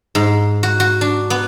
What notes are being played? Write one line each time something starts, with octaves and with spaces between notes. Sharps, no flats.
G#2
F#4
F#4
D4
B3